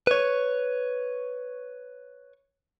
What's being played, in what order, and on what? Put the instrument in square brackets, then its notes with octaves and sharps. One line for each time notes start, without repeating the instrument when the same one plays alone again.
[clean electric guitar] B4 C#5